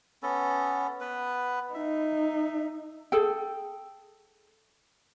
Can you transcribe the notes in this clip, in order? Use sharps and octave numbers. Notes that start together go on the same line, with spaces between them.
B3 C#4 A4
B3 B4
D#4 E5
G#4 A4 G5